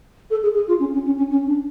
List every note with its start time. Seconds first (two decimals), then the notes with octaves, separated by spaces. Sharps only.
0.30 A4
0.43 G#4
0.55 G#4
0.68 F4
0.80 C#4
0.93 C#4
1.06 C#4
1.18 C#4
1.31 C#4
1.47 D4